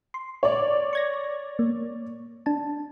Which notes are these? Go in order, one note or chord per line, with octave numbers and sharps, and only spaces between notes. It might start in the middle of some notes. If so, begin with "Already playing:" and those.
C6
C#5 D5
C#6 G#6 A#6
A#3
D4 A5